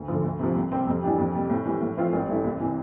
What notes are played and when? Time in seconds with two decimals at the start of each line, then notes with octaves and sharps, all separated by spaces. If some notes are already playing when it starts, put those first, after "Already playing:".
Already playing: D2
0.08 D3 F3
0.24 D2
0.39 C3 F3
0.55 C2
0.71 C3 G3 C4 G4
0.87 F2
1.03 E3 G3 D4 G4
1.18 F2
1.35 C3 G3
1.50 A2
1.66 E3 G3
1.81 A2
1.97 F3 C4 F4
2.13 A1
2.28 G2 E3 A3 E4
2.44 C2
2.60 C3 E3